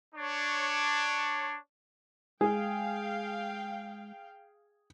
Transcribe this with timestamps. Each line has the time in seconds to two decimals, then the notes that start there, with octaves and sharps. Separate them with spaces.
0.15 D4 C#5
2.41 G#3 G#4 F5 G5